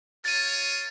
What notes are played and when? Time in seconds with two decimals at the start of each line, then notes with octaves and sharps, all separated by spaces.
0.25 F4 A#4 C#5 A6 D#7